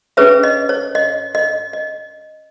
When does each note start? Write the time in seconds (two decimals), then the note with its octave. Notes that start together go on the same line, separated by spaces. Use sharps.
0.17 C#4 G#4 B4 C#5 E5
0.43 D#5
0.69 C#5
0.95 D#5
1.35 D#5
1.73 D#5